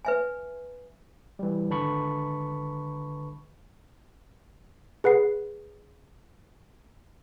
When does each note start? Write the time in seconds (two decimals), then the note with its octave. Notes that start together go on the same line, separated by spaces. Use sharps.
0.05 B4 E5 G#5
1.39 E3 G3
1.70 G#1 D3 B4 A5 B5 C#6
5.04 G#4 B4 F#5 C7